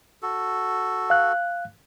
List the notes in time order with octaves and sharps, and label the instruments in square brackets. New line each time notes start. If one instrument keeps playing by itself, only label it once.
[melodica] F#4 A4
[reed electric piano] F5 F#6